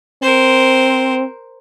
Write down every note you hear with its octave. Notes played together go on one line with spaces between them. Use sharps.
C4 A#4 C5